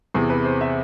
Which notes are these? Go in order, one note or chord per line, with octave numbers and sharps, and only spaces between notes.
E2 C3 E3 G#4
B4
C5
E5